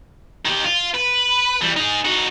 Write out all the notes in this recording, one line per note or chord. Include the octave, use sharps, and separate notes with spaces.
D#3 G4
F4
B4
E3 G3
D#4 G#4
D#4 F#4